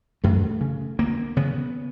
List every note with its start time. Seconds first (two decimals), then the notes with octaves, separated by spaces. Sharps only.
0.24 F#2 A3
0.61 C#3
0.99 D2 A#3
1.36 C#3 B3